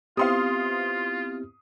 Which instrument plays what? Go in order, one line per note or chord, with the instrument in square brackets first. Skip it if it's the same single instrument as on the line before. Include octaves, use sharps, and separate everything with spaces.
[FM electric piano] B3 C4 E4 [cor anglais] F4 [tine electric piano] G4 [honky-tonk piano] F5 C6 D#6